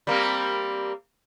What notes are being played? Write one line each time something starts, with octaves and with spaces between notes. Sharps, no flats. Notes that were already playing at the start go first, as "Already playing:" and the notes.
G3 A#3 C4